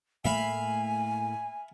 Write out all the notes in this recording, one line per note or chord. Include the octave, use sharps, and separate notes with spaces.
A2 A3 A#3 E5 F5 G#5 B5